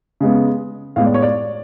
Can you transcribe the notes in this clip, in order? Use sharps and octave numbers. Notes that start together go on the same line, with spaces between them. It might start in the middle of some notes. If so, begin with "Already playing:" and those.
C#3 G#3 B3
A2 G#3 B3 F5
D5
C#5
D5